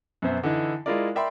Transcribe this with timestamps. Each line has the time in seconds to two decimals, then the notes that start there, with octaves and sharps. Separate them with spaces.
0.22 F#2 B2 C5 E5
0.43 D3 E3 D#4 E4
0.86 G#3 E4 F4 A#4 D5
1.15 A#4 D5 E5 G5 B5 C6